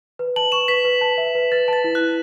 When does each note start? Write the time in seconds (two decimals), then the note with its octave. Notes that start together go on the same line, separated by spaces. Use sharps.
0.19 B4
0.36 A5 F#7
0.52 C#6 E7
0.68 B4 B6
0.85 B4
1.01 A5
1.18 E5
1.35 B4
1.52 B4 A6
1.68 A5 A6
1.84 E4
1.95 F#6
2.01 E4